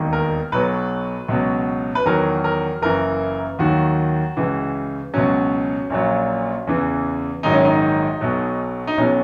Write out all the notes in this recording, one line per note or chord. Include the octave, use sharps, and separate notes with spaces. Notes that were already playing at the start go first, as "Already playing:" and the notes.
Already playing: E1 D#2 D#3
A#4
B1 B2 F#3 B4
C#2 B2 F#3
B4
E2 D#3 F#3 A#4
A#4
F#1 F#2 E3 A#4
D#2 D#3 F#3 F#4
C#2 C#3 E3
C#2 B2 F#3 C#4
A#1 A#2 F#3
E2 C#3 E3
A#1 G#2 D#3 F#3 D#4
C#4
D#4
B1 B2 F#3
D#4
B1 B2 F#3 C#4